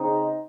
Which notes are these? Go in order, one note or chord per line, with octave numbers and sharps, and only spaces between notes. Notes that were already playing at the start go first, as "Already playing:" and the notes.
Already playing: C#3 C4 D#4